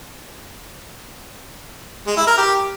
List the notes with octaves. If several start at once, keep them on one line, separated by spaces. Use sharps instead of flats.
G#3
E4
A#4
G4